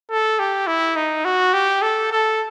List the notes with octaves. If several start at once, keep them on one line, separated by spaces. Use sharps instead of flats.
A4
G4
E4
D#4
F#4
G4
A4
A4